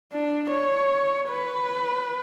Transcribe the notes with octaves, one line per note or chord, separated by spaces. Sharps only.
D4
C#5
B4